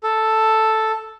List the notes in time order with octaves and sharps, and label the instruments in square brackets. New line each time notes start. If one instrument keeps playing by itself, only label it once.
[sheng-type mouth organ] A4